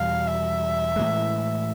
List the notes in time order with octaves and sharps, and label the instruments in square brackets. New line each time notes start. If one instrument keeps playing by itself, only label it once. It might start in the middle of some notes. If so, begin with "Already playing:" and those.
Already playing: [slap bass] E2 B2 G3 [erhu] F5
[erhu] E5
[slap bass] A2 E3 G#3